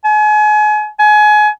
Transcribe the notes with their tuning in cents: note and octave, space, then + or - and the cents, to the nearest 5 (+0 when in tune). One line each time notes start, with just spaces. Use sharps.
G#5 +35
G#5 +25